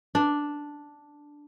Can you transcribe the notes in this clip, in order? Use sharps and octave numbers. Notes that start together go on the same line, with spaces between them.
D4